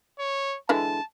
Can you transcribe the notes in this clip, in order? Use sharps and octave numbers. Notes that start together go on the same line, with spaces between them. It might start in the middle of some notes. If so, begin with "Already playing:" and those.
C#5
D3 E3 G#3 A5